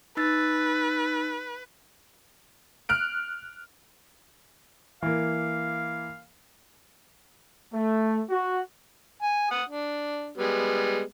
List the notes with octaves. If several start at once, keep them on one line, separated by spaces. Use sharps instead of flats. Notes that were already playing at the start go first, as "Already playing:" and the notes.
D#4 B4 E6 A6
F6 F#6 D7
E3 A#3 F5
A3
F#4
G#5
F#5 D#6
D4
G3 G#3 B3